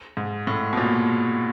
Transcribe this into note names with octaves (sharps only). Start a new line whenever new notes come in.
G#2
A2
B2
A#2